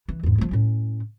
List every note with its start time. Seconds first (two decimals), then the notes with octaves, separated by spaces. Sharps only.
0.08 E3
0.23 E2 G#2
0.38 F3 A3
0.51 A2 C#4